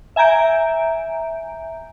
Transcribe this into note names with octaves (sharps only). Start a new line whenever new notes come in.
E5 G#5 A#5 G6 D7